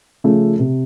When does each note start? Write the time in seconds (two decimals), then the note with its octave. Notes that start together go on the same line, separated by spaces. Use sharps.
0.24 C#3 F3 A3
0.59 C3